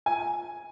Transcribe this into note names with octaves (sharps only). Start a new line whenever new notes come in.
G#5